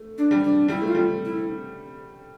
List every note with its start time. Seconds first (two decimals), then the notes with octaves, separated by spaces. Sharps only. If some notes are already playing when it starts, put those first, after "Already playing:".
Already playing: A3
0.18 D4
0.31 G3
0.43 D4
0.68 G3 E4
0.82 A3
0.88 F4
0.95 G3
1.25 E4